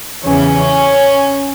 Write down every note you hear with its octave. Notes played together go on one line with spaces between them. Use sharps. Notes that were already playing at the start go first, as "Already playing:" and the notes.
E2 C#3 E3 C#4